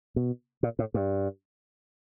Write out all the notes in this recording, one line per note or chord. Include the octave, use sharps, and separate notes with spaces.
B2
A#2
A2
G2